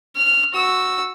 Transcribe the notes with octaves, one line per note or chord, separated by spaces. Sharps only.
F6
F#4 E6